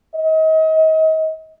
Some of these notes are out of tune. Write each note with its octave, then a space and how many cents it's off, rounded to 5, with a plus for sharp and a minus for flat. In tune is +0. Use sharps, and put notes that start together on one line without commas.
D#5 +35